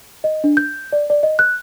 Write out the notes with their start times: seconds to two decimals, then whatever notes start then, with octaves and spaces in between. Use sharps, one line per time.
0.24 D#5
0.44 D4
0.57 G6
0.92 D5
1.10 D5
1.23 D#5
1.39 F#6